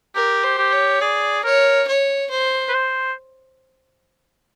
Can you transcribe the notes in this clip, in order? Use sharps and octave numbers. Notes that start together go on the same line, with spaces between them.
G4 A#4
C5
G4
C#5
G#4 D5
A#4 C#5
C#5
C5
B4
C5